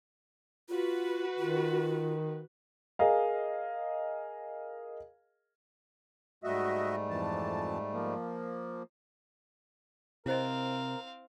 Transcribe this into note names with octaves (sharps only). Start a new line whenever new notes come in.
F4 F#4 B4
D#3 F4
G#4 A#4 D#5 F5
G#2 G3 A3 F#4 D#5 E5
F2 E3 A5
F3 A#3
C3 C4 E4 A#4 C5 D#5 F5